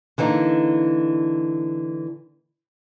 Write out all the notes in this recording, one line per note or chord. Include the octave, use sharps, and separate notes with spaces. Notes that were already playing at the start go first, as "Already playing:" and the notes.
D3 E3 A#3 D#4